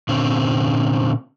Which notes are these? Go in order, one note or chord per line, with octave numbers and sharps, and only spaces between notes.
A#2 D3 C4 C#4